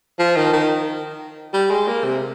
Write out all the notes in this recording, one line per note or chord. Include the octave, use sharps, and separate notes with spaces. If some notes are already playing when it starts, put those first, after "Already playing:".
F3
D#3
D#3
G3
G#3
A#3
C3